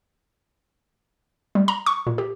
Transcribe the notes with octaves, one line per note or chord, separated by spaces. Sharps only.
G3
A#5
C#6
A#2
G4